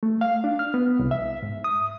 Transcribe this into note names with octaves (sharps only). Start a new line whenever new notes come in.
A3
F5
D4
F6
B3
C2
E5
G#2
D#6